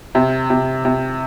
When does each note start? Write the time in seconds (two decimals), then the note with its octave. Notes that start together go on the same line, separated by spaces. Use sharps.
0.15 C3
0.50 C3
0.85 C3